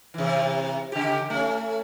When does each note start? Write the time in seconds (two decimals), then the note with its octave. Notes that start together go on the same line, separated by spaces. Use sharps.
0.14 C3 E3
0.92 C#3 G4
1.30 A3 C#4